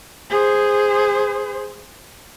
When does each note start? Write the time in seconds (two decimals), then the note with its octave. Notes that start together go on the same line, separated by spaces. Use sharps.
0.30 G#4 C5